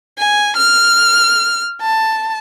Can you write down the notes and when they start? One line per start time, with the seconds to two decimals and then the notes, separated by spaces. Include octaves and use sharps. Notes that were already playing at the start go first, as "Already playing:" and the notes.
0.18 G#5
0.56 F6
1.81 A5